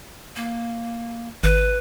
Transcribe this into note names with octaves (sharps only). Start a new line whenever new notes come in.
A#3
G#1 B4